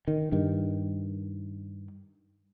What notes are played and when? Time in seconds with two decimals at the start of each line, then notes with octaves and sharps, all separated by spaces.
0.08 D#3
0.32 G2 D#3